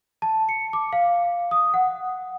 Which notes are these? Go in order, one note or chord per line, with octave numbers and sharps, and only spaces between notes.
A5
C#7
D6
F5
D#6
F#5